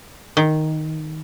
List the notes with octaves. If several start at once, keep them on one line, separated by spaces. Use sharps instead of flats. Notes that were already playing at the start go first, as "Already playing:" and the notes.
D#3